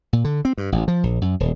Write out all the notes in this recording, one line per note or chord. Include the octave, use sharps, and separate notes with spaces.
A#2
D3
C4
G2
A1
F3
A#1
F#2
D#1